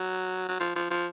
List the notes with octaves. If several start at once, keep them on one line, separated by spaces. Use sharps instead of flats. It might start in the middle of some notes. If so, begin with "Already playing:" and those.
Already playing: F#3
F#3
F3
F3
F3